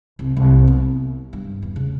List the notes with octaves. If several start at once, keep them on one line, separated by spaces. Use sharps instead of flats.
C2
C2
B3
G2
E2
C#3